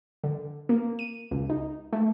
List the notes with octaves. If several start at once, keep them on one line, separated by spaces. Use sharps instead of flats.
D3
A#3
D#7
C#2
D#4
A3